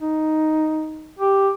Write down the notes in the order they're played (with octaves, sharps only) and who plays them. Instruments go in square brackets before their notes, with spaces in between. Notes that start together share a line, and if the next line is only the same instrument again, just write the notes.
[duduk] D#4
G4